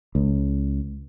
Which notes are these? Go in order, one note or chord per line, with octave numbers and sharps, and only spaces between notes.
C#2